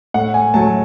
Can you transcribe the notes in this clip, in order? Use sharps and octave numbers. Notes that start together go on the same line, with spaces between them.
A2 F#5
G#5
F#3 A3 A5